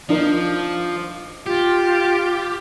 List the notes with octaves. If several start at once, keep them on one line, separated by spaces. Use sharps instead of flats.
F3 D4 D#4 A#4
F4 G4